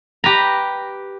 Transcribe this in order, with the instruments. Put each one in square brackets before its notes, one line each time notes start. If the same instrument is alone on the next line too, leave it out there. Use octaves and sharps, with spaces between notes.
[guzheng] G4 B4 A#5